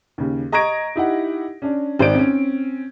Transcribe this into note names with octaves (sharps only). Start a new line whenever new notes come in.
D#2 C#3
D#5 A#5 C#6 G#6 A#6 D7
D#4 E4 G4 F#5
C#4 D4
G#1 C5 D5 D7
C4 C#4